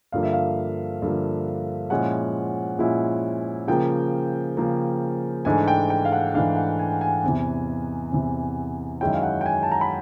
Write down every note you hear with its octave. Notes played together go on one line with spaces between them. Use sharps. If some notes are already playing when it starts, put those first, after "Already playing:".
G2 D3 F3 A#3 F5
E5
F5
G2 D3 F3 A#3
A#2 F3 G#3 C#4 E4 F#5
A#2 F3 G#3 C#4 E4
C#3 F3 A#3 G5
C#3 F3 A#3
G#2 E3 A3 D4 G#5
G5
G5
F5
F#5
G#2 E3 A3 D4 F5
F#5
G#5
G#5
E2 C3 E3
E2 C3 E3
F#2 D#3 G#3 C#4 E4 G5
F5
F#5
G5
G#5
A5
A#5
B5